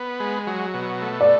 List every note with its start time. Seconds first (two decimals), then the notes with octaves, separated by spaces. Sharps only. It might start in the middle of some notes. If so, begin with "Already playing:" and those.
Already playing: B3
0.20 G#3
0.47 F#3
0.74 B2
1.01 A3
1.21 D5